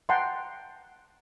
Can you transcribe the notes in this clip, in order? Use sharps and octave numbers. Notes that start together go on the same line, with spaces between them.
F#5 G5 A5 A#5 C6